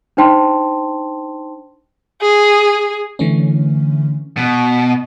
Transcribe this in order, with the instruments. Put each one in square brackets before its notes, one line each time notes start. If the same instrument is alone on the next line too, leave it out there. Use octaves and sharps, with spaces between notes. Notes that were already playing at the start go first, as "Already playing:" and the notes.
[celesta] D4 D#4 C5 G5 A5 C6
[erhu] G#4
[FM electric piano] D3 E3 A3 C#4
[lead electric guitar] B2